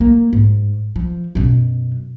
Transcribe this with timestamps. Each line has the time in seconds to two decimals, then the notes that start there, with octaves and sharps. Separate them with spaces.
0.01 A#3
0.33 G#2
0.96 F3
1.35 F#2 B2